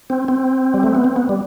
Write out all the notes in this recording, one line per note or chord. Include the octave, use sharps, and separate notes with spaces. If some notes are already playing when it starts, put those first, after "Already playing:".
C4
C4
G3
A3
B3
C4
B3
G3